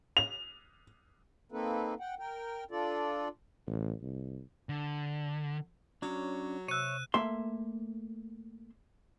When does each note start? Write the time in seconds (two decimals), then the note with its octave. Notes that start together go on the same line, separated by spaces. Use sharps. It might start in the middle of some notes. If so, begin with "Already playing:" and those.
0.17 F7
1.52 A#3 C4 D#4 A4 B4
2.00 F#5 G5
2.19 A#4 G5
2.71 D4 F4 A4 D5
3.67 A1
4.02 C2
4.69 D3
6.02 F#3 C#4 D4
6.68 C3 C#5 E5 E6 F#6 D#7
7.14 A3 A#3 E5 C6